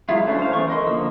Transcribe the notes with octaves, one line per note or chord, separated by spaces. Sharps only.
F#3 G#3 E4 F4
A3 C#4 D4
C5 F5
E3 A3 B3 C#4 C#6
A#4 D#5 C6
D3 F3 A#3 E6